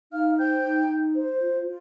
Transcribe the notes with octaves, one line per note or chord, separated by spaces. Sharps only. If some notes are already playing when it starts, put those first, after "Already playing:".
D#4 F5 F6
C5 G5 G6
D#4
D#4
C5
F4
F4